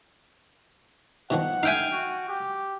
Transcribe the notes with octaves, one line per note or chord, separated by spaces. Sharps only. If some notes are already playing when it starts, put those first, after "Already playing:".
B2 D#3 F3 F#5
D#4 E5 F5 G5 G#5
F#4
G4